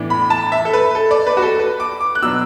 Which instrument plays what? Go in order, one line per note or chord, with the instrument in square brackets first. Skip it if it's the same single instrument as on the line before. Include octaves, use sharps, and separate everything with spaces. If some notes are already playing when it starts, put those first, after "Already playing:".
Already playing: [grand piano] A2 E3 B3 D4
B5
A5
E5
A4
B4
A4
D5
B4
F#4
A4
B4
D6
D6
F#6
B2 F#3 B3 D4 E6